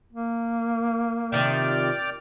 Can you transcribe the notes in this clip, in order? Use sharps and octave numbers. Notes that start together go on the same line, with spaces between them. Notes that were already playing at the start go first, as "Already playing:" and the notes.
A#3
C3 D#3 F3 D5 G5 F6